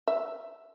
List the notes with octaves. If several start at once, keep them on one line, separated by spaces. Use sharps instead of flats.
E5